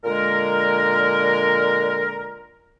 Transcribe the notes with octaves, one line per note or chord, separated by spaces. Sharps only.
A#2 D3 G#3 A#4